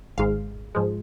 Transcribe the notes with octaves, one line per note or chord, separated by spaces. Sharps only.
G#1 G#2 G#3 F5
G#2 F3 G#3